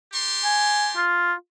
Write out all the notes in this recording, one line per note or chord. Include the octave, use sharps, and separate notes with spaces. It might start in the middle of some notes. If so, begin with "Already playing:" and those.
G4 A5 C6
G#5
F4